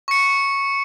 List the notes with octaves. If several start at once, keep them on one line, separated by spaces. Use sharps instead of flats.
C#6 C#7